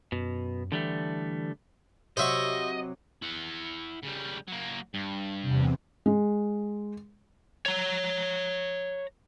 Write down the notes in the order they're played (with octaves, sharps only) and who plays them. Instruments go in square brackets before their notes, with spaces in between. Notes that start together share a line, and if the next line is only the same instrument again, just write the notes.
[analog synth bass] F#2 [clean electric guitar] B2
[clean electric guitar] D3 G3 A3 [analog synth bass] E3
[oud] C3 F#3 [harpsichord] C5 E5 C#6 [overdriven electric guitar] D#5
[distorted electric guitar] E4 F#5
C#3 G3
F#3 A#3
G2
[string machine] E2 C3
[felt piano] G#3
[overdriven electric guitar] C#5 A#5